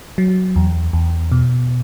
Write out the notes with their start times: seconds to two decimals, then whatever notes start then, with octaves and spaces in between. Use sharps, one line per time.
0.18 F#3
0.56 E2
0.93 E2
1.32 B2